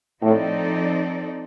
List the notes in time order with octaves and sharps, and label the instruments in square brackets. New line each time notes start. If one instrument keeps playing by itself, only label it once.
[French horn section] A2 [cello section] F3 C4 D#4 A4 D5